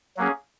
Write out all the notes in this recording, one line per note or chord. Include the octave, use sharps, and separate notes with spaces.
F#3 A#3 C#4 G#4